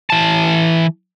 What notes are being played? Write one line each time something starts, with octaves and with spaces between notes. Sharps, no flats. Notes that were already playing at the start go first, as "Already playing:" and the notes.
E3 A5